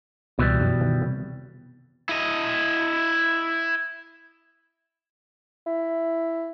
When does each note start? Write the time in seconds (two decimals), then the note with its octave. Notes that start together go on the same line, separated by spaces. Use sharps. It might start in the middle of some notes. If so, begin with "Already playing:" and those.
0.39 C#2 B2 E3 G3
0.61 F#2
0.81 D#3
1.02 C3
2.09 E4 D#5
5.66 E4